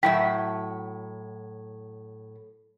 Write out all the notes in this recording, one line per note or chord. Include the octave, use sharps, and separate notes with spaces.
A2 F#3 E5 G5 B6